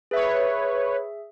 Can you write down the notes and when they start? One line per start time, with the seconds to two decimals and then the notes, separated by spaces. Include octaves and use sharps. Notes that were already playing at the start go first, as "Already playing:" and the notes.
0.11 G#4 B4 C#5 E5